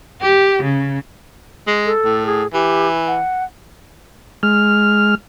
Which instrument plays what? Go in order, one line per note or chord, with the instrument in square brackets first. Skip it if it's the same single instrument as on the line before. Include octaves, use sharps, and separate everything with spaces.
[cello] G4
C#3
[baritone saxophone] G#3
[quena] A4
[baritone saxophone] A2
[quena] G#4
[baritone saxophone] E3 [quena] G4
[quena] F#5
[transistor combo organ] G#3 F6